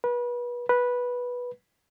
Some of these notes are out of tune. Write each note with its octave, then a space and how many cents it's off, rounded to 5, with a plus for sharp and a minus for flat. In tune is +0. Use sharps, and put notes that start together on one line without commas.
B4 -30
B4 -10